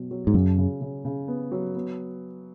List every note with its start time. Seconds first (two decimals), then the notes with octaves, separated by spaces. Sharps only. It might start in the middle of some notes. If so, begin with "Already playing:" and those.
Already playing: B2 F#3
0.11 F#3
0.27 G#2
0.34 F#2 C#3
0.58 C#3
0.81 C#3
1.05 C#3
1.28 B3
1.52 F#3
1.75 B3